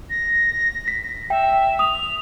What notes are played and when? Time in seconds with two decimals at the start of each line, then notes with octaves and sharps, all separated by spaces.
0.10 A#6
0.88 B6
1.30 E5 G5
1.79 D#6 F7